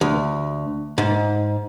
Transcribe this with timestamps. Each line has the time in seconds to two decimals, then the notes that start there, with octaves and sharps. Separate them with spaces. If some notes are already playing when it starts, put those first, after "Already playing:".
0.01 D2
0.98 G#2